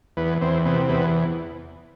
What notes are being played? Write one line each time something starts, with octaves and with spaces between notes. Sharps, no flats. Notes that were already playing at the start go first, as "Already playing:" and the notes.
E2 B3
E2 C4
C3 B3
E2 B3